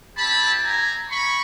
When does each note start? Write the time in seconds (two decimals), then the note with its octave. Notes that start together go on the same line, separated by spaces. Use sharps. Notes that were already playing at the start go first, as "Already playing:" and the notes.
0.16 C4 E4 G4 A5 B5
0.63 G#5 A#5
1.11 B5 C#6